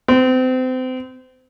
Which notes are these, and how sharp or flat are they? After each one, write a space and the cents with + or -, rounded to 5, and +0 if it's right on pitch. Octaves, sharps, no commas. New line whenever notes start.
C4 -30